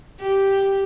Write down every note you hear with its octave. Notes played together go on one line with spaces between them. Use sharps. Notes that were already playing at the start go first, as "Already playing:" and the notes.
G4